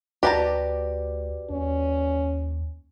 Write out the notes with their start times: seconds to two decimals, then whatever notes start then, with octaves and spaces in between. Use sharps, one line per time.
0.23 D2 F#4 G4 B4 D5 A5 A#5
1.50 D#2 C#4